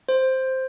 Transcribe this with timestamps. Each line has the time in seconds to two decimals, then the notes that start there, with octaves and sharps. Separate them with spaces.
0.09 C5